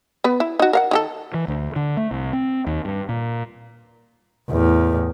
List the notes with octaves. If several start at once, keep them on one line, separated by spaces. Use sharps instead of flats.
B3 B4
E4
D#4 F#4
A#4 F5 F#5
D#3 G4 A4
E3
D2
D3
A3
C2
C4
D#2
G2
A#2
E2 A2